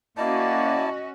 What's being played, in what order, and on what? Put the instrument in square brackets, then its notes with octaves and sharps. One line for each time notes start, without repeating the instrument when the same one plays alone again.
[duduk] A#3 [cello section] C#4 F#4 [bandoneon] E4 D5 A5 [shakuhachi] D#5